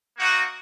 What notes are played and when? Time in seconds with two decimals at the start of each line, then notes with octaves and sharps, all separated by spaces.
0.17 A#3 D#4 F#4